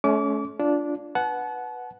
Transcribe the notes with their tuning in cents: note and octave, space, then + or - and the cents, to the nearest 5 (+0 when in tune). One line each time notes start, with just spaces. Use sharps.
A3 -35 C#4 +15 D6 -35
D4 -10 F4 -10
B4 +0 F#5 +0 A5 -35